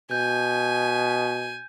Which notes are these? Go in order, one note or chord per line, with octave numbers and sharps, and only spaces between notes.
B2 G#5 G6